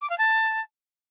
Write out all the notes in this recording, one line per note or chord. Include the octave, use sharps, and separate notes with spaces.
D6
F5
A5